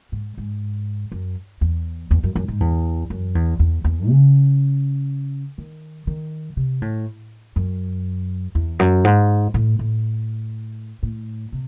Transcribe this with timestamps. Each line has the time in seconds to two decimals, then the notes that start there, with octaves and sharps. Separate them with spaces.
0.12 G#2
0.38 G#2
1.12 F#2
1.61 E2
2.11 E2
2.24 F#2
2.36 F#2
2.48 G#2
2.60 E2
3.10 F#2
3.35 E2
3.59 E2
3.84 E2
4.09 C#3
5.58 D#3
6.07 D#3
6.57 C3
6.82 A2
7.56 F#2
8.55 E2
8.79 F#2
9.05 G#2
9.54 A2
9.79 A2
11.03 A2
11.52 C3